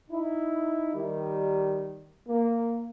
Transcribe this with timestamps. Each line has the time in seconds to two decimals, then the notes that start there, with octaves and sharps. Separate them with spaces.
0.10 D#4 E4
0.94 D#3 G3
2.28 A#3